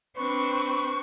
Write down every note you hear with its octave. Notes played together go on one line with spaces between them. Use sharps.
C4 D4 B4 C#6